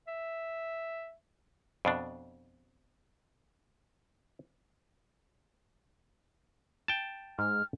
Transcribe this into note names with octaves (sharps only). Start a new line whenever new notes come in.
E5
F2 B2 D4
G5 A5
G#2 F6